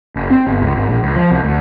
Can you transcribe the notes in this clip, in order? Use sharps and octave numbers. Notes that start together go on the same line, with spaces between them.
F#1
C4
G1
C#2
G#1
A#1
C#2
F3
C2
D2